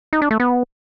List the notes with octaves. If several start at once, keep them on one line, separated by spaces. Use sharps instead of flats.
D#4
D4
A3
B3